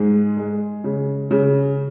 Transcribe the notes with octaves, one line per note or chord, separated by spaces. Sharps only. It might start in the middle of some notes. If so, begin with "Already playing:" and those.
Already playing: G#2 G#3
G#3
C#3
C#3